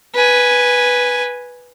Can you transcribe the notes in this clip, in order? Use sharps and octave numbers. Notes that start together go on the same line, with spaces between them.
B4 G#5